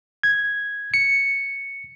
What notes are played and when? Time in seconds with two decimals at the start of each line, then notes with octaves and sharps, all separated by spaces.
0.23 G#6
0.94 C#7